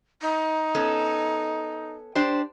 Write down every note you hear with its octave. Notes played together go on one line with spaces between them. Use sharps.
D#4
B3 C#4 A4
D4 G4 C5